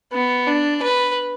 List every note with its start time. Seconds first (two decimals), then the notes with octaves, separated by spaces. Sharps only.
0.13 B3
0.47 D4
0.82 B4